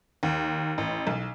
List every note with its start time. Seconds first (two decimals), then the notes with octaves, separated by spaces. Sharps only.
0.23 D#2
0.78 A1
1.07 B1